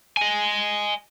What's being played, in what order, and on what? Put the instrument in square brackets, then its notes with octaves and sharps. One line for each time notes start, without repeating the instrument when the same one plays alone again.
[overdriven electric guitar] D#5 G#5